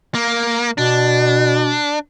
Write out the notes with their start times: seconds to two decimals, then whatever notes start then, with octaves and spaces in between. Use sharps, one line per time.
0.15 A#3
0.78 B2 D4